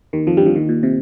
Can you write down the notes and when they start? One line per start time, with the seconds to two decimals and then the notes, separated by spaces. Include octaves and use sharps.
0.13 D#2 D#3
0.27 F2 F3
0.37 G2 G3
0.46 F2 F3
0.55 D#2 D#3
0.69 A#2
0.83 C3